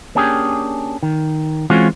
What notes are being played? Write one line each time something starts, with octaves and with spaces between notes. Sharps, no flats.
A#3 C#4 D4 G4 G#4
D#3
E3 G#3 C4 C#4 F4 F#4